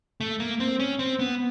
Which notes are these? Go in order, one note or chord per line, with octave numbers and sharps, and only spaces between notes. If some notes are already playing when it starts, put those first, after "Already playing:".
A3
A#3
C4
C#4
C4
B3